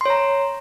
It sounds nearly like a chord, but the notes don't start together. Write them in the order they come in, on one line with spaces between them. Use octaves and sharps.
C6 C#5 A#5